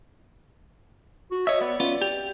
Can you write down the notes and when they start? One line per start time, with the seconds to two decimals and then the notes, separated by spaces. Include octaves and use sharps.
1.31 F#4
1.47 C#5 D#5 E5
1.61 B3 D5
1.80 B3 C#4 F4
2.02 G4